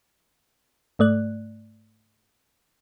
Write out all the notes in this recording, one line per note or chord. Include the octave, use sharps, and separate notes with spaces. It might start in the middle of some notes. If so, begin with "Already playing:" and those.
G#2 A3 D5 F#6